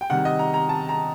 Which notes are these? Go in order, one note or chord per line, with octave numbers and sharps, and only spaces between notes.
G5
C3 D#3 G3 F#5
D#5
A#5
A#5
A5
A#5